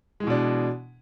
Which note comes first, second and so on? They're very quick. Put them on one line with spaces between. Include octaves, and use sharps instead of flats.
G#3 E3 B2 D4